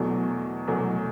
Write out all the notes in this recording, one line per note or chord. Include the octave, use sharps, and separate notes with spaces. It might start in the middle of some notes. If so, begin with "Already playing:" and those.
Already playing: E2 B2 F#3 A3
E2 B2 F#3 A3